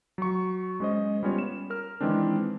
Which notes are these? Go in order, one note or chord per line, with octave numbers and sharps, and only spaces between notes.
F#3 C#6
G#3 C#4 C5 D#5
G3 B3 C#4 F4 C#5
E7
A#4 F6
D#3 E3 G#3 C4 D4